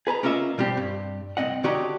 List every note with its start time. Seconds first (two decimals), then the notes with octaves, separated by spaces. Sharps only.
0.07 G#4 B4 A5 A#5
0.23 A#3 C#4 F4 D#5 E5
0.58 B2 G3 C4 G4
0.77 G2
1.37 C2 B2 C4 D#5 F#5
1.64 D3 F#4 G4 C#5 D#5 A#5